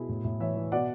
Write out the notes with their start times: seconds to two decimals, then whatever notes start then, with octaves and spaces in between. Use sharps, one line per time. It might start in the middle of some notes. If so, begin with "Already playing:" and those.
Already playing: B2 E4 G#4
0.09 A2
0.24 A2
0.40 E3 C#5 E5
0.56 E3
0.72 B2 D5 F#5